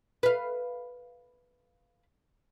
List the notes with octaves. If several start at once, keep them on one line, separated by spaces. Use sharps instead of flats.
B4 F5